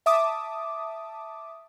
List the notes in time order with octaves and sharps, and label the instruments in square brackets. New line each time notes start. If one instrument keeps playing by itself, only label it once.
[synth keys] E5 A5 D6 D#6